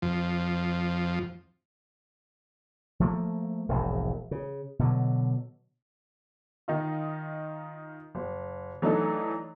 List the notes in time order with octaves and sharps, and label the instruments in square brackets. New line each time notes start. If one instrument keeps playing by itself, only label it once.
[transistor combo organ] F2 F3
[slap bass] F3 A3 A#3
E1 A#1 G#2
C#3
B2 D3 F#3
[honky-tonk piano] D#3 D#4 F4
F#1
E3 F#3 A3 D4 D#4 A4